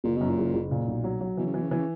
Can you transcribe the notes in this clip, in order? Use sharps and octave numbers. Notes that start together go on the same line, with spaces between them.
F#1 A#2
F#2 B2
A#2
F#1
F#1
A#2
B1
F#3
F#3
B2 E3
C#3
B2 E3
C#3
B2 E3
C#3